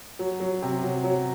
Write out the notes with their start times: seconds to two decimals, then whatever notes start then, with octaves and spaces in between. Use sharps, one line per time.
0.19 F#3
0.40 F#3
0.62 C3
0.83 F#3
1.04 F#3